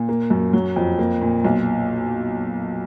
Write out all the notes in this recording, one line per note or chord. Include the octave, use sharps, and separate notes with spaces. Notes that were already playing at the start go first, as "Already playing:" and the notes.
Already playing: A#2
A#3
F#2
F#3
F2
A#3
A#2
B1